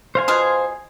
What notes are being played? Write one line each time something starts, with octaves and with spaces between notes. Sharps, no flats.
C5 F5 G#5
B2 F4 G#4